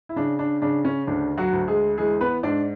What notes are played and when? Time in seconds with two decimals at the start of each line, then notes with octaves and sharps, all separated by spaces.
0.09 E4
0.16 C#3 D4
0.39 D4
0.62 C#3 D4
0.85 C#4
1.07 D2 D4
1.38 F#3 F#4
1.53 D2
1.68 G#3 G#4
1.98 E3 G#3 G#4
2.21 B3 B4
2.43 G#2 D4 D5